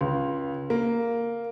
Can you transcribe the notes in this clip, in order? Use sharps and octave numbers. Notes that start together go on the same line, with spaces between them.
C#2
A#3